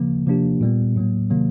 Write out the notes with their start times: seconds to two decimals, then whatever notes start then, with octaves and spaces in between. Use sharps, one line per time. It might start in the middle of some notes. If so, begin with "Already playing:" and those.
Already playing: C#3 F3 A#3
0.26 C3 F3 A#3 D4 G4
0.61 A#2 G3 B3
0.96 A2 F#3 A#3
1.30 C3 D#3 F#3 A#3